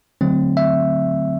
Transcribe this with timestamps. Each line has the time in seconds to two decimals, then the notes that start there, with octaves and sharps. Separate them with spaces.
0.21 D3 F#3 A3 C4
0.57 E5